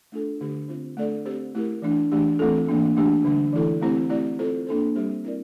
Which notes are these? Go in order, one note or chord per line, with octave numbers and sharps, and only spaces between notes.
A3 D4 F4 A4
D3 A3 D4 G4
C4 F4 C5
A3 D4 A4 D5
C4 G4 C5
A3 E4 G4 A#4
E3 A3 D4
E3 A3 D4 G4
E3 A3 C4 F4 A4
E3 A#3 D4
E3 A3 D4 G4
D3 G3 D4
E3 A3 E4 A4
A3 C4 E4 G4 C5
A3 C4 E4 G4 D5
C4 F4 A4 C5
A#3 D4 A4 C5
G3 C4 G4 C5
C4 E4 A#4 D5